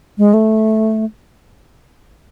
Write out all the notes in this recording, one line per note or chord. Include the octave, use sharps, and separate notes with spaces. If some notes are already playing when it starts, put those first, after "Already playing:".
G#3
A3